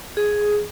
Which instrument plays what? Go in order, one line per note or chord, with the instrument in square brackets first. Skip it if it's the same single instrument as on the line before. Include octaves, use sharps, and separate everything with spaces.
[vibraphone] G#4